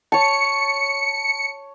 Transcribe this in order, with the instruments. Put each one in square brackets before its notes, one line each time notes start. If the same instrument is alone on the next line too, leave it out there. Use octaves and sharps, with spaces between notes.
[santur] C#5 A5 [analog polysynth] C#7